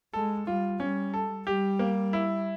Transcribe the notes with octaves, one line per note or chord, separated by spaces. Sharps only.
G#3 A4
G3 F4
G3 C#4
A4
G3 G4
A#3
E4